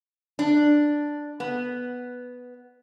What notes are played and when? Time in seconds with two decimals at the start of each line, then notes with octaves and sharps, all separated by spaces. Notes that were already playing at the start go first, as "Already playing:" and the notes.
0.39 D4
1.40 B3